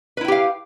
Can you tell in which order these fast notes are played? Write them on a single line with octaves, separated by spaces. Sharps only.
B4 E4 G5 G4 F5